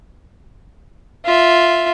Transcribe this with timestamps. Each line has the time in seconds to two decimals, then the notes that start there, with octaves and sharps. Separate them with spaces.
1.25 F4 E5